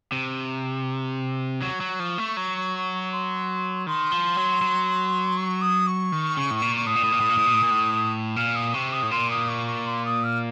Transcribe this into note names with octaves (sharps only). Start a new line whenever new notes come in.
C3
F#3 C#6
F#3
F3
A3
F#3
C6
D#3 C6
F3
F#3
F#3
C#6
D#6
C#6
D#3
C#3
A2
A#2
C#6
A2 D#6
A#2
A2
A#2
A2
A#2
A2
A#2
A2
A#2
A2
A#2 F6
D#6
C3 C#6
D#6
A2
A#2 C6
D#6
C#6
C#6
C6
D#6
F6